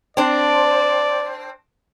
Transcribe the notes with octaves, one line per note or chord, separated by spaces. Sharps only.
C4 D4 D5